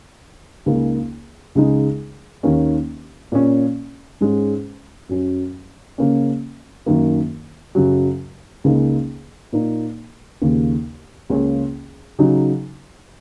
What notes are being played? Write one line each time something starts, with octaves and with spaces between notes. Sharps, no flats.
C#2 C#3 A#3 D#4
C#2 C#3 G#3 D#4
D#2 D#3 A#3 C#4
A#2 A#3 C#4
G#2 G#3 C#4
F#2 F#3 C#4
C#3 A#3 C#4
F#2 D#3 A#3
F#2 C#3 F#3
C#2 C#3 A#3 D#4
A#2 A#3 D#4
D#2 C#3 A#3
C#2 C#3 A#3 C#4
C#3 F#3 D#4